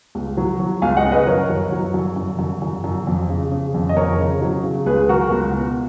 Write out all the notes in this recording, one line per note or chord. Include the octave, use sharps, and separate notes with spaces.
C#2
F#3
F#3
C#2 F5 G#5
D#5 F#5
C#3
B4 D#5
F#2 A#4 C#5
F#2
F#3
F#2
F#2
F#2
F#2
F#2
F2
C#3
C#3
F2
D#5
F2 A#4 C#5
C#3
F#3
C#3
C#2 G#4 B4
F#3 F#4 A#4
C#2
B2